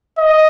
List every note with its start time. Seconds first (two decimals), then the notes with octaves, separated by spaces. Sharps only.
0.18 D#5